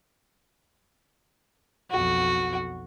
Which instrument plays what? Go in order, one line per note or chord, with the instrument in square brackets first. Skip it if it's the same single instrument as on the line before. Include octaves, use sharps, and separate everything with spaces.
[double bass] B1 F2 [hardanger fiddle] F#4